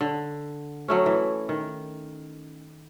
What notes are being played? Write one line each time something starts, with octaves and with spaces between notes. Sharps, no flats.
D3
F#3 A3 C#4
E3
D#3